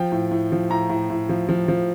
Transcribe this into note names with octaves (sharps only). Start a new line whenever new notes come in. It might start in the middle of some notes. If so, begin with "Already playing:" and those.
Already playing: F3 G5
A2
A2
F3
A2 A#5
A2
A2
F3
F3
F3